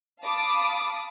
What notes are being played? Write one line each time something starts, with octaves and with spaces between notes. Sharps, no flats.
F5 A5 B5 D6 D#6